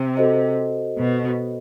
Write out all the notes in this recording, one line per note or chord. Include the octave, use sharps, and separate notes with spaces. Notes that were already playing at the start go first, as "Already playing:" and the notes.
Already playing: C3
F#4 A4 C5 D#5
B2